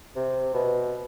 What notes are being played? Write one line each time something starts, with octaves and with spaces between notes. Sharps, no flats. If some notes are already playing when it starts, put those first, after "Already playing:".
C3
B2